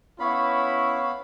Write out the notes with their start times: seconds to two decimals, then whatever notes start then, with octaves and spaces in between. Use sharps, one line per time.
0.20 B3 C#4 E4 F5 B5 C#6